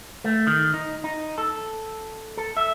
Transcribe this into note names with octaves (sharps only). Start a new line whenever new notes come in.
A3
D#3
D#4
D#4
A4
A4
E5